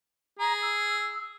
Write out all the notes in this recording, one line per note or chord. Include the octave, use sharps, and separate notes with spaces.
G#4 A#5
E6